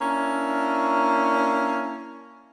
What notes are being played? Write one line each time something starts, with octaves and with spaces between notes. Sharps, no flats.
A#3 C#4 D4 E4